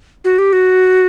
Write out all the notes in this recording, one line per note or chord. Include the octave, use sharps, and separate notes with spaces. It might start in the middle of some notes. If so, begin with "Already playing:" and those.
F#4
G4
F#4